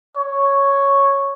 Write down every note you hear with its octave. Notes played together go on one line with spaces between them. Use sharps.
C#5